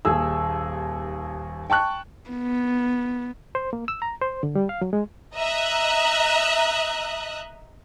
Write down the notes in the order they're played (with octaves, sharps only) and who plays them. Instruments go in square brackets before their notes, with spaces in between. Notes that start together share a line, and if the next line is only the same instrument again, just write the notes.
[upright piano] D#1 D#2 G#4 E6
G5 A5 C#6 F#6
[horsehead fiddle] B3
[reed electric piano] C5
A#3
E6
A#5
C5
D3
G3
F5
F#3
G#3
[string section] D#5 E5 A#5 D#6 F#6